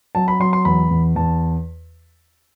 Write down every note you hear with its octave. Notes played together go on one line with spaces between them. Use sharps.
F#3 A5
B5
F#3 C6
C6
E2 B5
E2
E2 A5